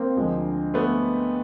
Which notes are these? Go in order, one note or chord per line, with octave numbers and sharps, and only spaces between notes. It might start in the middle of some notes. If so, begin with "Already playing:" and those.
Already playing: A#3 C4
D2 D3 F3 G#3
A3 B3